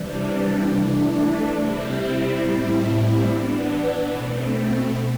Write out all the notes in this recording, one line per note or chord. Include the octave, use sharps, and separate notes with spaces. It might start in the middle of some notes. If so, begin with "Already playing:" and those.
Already playing: C3 E3 G3 D4
E3 A3 D4
C3 G3 C4 E4
A2 G3 C4 E4
E3 B3 D4
B2 A3 C4